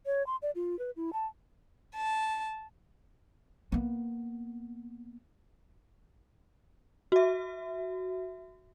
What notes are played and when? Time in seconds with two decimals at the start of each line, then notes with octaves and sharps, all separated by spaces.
0.06 C#5
0.27 C6
0.42 D5
0.55 F4
0.79 B4
0.96 E4
1.13 A5
1.97 A5
3.72 A#3 B3
7.12 F#4 E5